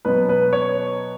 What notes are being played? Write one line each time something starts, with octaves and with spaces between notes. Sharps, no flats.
B2 F#3 B3 B4
B4
C#5